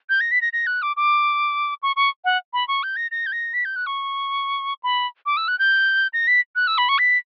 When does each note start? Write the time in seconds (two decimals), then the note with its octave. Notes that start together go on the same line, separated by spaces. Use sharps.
0.09 G6
0.20 A#6
0.31 B6
0.41 A#6
0.53 A#6
0.67 F#6
0.82 D6
0.96 D6
1.83 C#6
1.96 C#6
2.24 F#5
2.53 B5
2.68 C#6
2.83 G6
2.96 A#6
3.11 A#6
3.26 G6
3.32 A#6
3.54 B6
3.65 G6
3.76 F#6
3.86 C#6
4.83 B5
5.26 D6
5.37 E6
5.48 F#6
5.59 G6
6.13 A#6
6.27 B6
6.56 F#6
6.67 E6
6.78 B5
6.89 C#6
6.98 B6